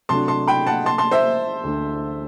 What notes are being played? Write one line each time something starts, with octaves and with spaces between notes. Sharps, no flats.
C3 F#3 A3 D4 A5 C6
A5 C6
G5 B5
F#5 A5
A5 C6
A5 C6
C5 E5
D2 D3 A3 D4